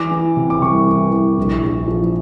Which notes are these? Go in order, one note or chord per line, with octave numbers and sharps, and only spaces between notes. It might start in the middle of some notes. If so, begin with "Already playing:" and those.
Already playing: E3 D6
E3
C3
D6
C2 C#6
E3
E3
A#1
A#1
F3